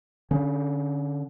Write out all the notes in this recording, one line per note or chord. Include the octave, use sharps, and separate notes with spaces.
D3 C#4